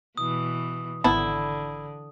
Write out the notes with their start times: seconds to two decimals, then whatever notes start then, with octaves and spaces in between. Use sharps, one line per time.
0.17 B2 E3 D#6
1.04 G#1 D3 B3 E4 A5